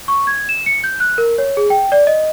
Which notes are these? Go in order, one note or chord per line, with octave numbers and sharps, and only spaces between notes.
C#6
G#6
E7
C#7
G6
F#6
A#4
C#5
G#4
G5
D5
D#5